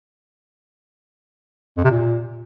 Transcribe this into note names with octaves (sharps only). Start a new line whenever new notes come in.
F2
C3
A#2